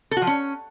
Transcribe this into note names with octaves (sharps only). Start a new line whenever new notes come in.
A4
F#4
F3
C#4